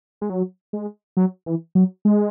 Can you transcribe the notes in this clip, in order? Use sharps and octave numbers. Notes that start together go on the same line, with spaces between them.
G#3
F#3
G#3
F#3
E3
F#3
G#3